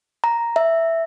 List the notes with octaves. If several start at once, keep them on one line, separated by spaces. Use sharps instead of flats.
A#5
E5